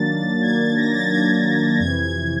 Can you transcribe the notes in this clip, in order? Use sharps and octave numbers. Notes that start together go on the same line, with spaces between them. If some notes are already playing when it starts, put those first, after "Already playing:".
Already playing: D#3 F#3 A#3 D4 A6
G#6
A6
A#6
A6
G#6
F2 C3 E3 G#6
G#6